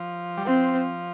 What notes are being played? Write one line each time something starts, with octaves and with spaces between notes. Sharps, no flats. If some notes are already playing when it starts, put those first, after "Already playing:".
Already playing: F3
G3
F3 C4